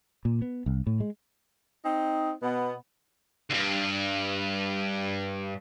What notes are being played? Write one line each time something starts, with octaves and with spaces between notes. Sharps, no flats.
A#2
B3
C2
A2
G#3
C4 D#4
B2 B3
D2 G2